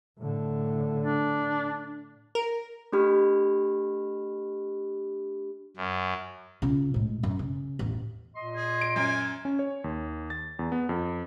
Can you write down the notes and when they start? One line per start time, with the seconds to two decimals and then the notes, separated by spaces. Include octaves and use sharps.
0.19 A2 D3
1.04 D4
2.35 A#4
2.92 A3 D4 G4 B5 F6
5.76 F#2
6.62 C#3 F4
6.94 A2 G#3
7.23 F#2
7.39 C#3
7.79 A1 E2
8.35 A#2 D#5 C6
8.56 G#4
8.81 D7
8.96 F#2 G#5
9.45 C#4
9.59 C#5
9.84 D#2
10.30 A6
10.59 E2
10.72 B3
10.89 F2